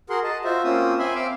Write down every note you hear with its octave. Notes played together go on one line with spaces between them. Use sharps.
F#4 G#4 A#4 F#5 C6
D#5 A5
F4 F#4 C5 E5
A#3 C4 C#4 F4 D#6 E6
C4 E5 G#5 B5 C6
C4 F5 D6 E6